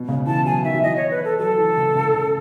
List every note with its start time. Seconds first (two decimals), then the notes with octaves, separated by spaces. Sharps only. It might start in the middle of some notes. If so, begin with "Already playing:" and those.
Already playing: B2
0.08 C#3
0.26 E3 A5
0.45 F#3 G#5
0.64 D#3 E5
0.75 F#3
0.83 E3 D#5
0.97 C#5
1.11 B4
1.24 A4
1.38 F#3 A4
1.58 E3
1.77 C#3
1.95 C#3
2.14 C#3